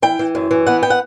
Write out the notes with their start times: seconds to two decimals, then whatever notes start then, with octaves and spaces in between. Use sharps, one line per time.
0.02 E3 G5
0.19 E3
0.35 F#2
0.51 E3
0.66 B3 F#5
0.83 G5
0.90 F#5